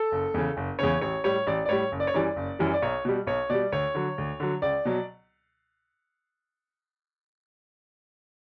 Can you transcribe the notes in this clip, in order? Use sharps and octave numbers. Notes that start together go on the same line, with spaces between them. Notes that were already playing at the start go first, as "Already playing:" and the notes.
Already playing: A4
F#1
E2 C#3
F#1
E2 C#3 C#5
A1 C#5
A2 G3 C#5
A1 D5
D5
A2 G3 C#5
F#1
D5
C#5
F#2 E3 G3 D5
F#1
F#2 E3 G3
D5
B1 C#5
B2 G3
B1 C#5
B2 G3 D5
D2 C#5
D3 F#3
D2
D3 F#3
C#2 D5
B2 F#3